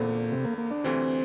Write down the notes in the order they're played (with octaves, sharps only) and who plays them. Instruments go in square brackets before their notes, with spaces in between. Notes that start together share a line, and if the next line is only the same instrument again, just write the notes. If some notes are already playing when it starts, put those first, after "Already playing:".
Already playing: [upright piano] E2 D3 A3 C4 [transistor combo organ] A#2
[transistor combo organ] C3
A#3
A#3
D4
[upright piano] D2 C3 E3 [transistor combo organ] C4